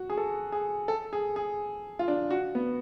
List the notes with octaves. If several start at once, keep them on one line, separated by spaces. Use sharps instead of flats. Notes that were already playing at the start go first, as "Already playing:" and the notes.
Already playing: F#4
G#4
A4
G#4
A4
G#4
G#4
F4
D4
F#4
B3